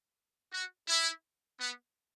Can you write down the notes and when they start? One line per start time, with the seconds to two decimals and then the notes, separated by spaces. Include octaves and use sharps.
0.52 F#4
0.88 E4
1.60 B3